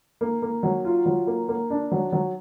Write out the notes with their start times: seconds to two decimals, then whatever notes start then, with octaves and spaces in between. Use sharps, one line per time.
0.21 A#3
0.42 A#3
0.63 F#3
0.85 F4
1.06 F#3
1.27 A#3
1.49 A#3
1.70 D4
1.92 F#3
2.13 F#3